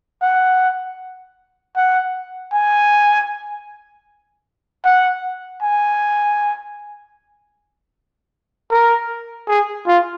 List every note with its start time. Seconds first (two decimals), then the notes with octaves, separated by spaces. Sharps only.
0.22 F#5
1.76 F#5
2.53 G#5
4.85 F#5
5.62 G#5
8.71 A#4
9.48 G#4
9.87 F4